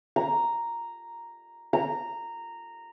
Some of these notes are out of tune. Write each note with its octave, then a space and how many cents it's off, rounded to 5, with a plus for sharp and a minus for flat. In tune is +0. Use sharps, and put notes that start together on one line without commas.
A#5 +0
A#5 -10